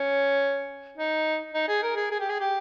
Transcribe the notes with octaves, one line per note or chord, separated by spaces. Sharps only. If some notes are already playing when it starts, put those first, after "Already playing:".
Already playing: C#4
D#4
D#4
G#4
A#4
G#4
G#4
G4
G#4
G4